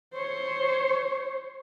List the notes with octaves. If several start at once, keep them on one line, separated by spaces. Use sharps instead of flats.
C5 C#5